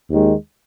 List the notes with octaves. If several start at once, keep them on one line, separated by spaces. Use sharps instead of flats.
D#2 D#3 G#3